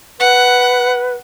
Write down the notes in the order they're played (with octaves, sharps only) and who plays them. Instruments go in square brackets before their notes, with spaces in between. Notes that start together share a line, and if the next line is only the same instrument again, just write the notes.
[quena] B4 [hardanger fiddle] F#5